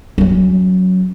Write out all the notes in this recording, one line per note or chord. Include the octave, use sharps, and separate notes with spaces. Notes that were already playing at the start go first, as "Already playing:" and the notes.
F#3 C#4